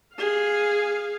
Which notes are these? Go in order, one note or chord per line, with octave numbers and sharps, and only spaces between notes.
G#4 F5